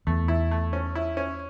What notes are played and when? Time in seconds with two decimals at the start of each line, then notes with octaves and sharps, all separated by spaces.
0.07 E2 A3
0.28 E4
0.51 A3
0.73 C#4
0.95 E4
1.17 C#4